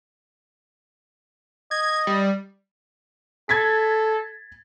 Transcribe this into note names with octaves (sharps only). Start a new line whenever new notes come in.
D#5 G#6
G3
A4 G#6 A6 B6